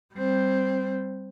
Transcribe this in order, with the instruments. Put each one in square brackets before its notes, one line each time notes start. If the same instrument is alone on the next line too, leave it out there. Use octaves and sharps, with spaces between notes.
[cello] G3 C4